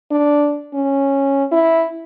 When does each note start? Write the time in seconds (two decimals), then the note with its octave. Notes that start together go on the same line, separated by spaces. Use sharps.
0.11 D4
0.74 C#4
1.52 E4